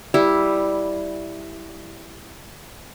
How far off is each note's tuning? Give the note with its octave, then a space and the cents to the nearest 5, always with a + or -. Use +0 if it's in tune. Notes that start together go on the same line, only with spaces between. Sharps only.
G3 +0 E4 +0